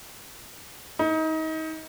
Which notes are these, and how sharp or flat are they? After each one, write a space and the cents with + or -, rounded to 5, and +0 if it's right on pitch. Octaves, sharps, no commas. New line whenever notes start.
D#4 +30